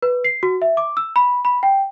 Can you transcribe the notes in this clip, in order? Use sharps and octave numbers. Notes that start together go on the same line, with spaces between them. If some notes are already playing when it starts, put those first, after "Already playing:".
B4
C7
F#4
E5
D6
E6
B5
B5
G5